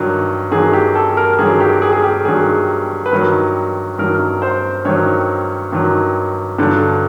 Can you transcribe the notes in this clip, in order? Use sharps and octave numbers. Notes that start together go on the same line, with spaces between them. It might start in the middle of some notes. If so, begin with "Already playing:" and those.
Already playing: G2 D#3 F#3
G2 D#3 F#3 G#4
G4
A4
A#4
G2 D#3 F#3 G#4
G4
G#4
G#4
G4
G2 D#3 F#3 G#4
B4
G2 D#3 F#3 A#4
G2 D#3 F#3 A#4
C5
G2 D#3 F#3 C#5
G2 D#3 F#3
G2 D3 F#3